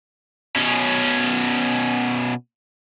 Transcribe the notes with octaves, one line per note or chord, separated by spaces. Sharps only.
B2 C#4